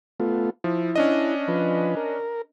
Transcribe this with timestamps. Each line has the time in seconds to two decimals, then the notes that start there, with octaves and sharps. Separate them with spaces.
0.20 A3 B3 F4
0.64 F3 E4
0.96 C#4 D4 D#5
1.48 F3 B4
1.97 A#4